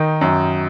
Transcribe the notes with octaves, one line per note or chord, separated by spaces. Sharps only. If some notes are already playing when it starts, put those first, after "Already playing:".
Already playing: D#3 D#4
F#2